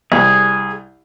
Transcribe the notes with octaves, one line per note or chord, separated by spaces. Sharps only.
C2 G#4